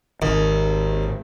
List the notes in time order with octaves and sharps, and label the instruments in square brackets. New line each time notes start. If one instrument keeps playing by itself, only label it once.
[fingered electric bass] G#1 [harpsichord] D#2